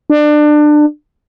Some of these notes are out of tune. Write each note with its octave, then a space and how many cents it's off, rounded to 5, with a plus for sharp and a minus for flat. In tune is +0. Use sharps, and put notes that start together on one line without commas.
D4 +25